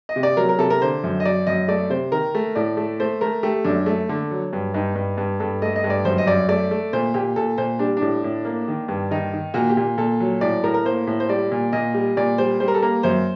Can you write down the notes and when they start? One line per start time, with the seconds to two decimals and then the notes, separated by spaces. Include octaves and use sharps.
0.09 D#5
0.16 C3
0.23 D5
0.37 F#3 A#4
0.49 A#4
0.59 C3 A4
0.70 A#4
0.81 D3 C5
1.04 F#2
1.20 D#5
1.25 F#3 D5
1.47 F#2 D#5
1.68 A3 D5
1.90 C3 C5
2.12 D#3 A#4
2.35 A3
2.55 A2 D5
2.77 A3
3.00 A3 C5
3.21 A3 A#4
3.43 A3 G4
3.64 F#2 D4
3.86 A3
4.09 D3
4.31 F#3
4.53 G2
4.74 G2 D#4
4.95 G2
5.18 G2
5.40 G2 A4
5.62 A3 D#5
5.76 D#5
5.84 G2
5.90 D5
6.05 F#2 C5
6.18 D#5
6.26 F#2 D5
6.49 A3 D5
6.71 A3
6.93 A#2 C5
7.14 A#2 G4
7.36 A#2 A4
7.58 A#2 C5
7.79 G3 D4
7.97 A2 D4
8.24 A2
8.45 A#3
8.68 D#3
8.88 G2
9.11 D#3 D#4
9.33 D#3
9.54 A#2 F#4
9.69 G4
9.77 A#2
9.98 A#2 A4
10.20 F#3
10.41 A2 D5
10.64 A2 A#4
10.74 A#4
10.85 A#3 C5
11.07 A2
11.20 C5
11.29 G3 D5
11.52 A#2
11.73 A#2 D#5
11.94 G3
12.17 A#2 D5
12.38 G3 C5
12.60 G3 C5
12.68 A#4
12.74 A4
12.82 A#3 A#4
13.03 F#2 C5